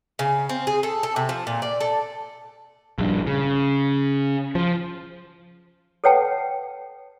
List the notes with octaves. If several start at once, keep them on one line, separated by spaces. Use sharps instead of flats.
C#3
C4
G#4
A4
A4
C3
F3
A#2
D5
A4
A#1 G2
C#3
F3
A4 B4 C#5 F#5 G5 A5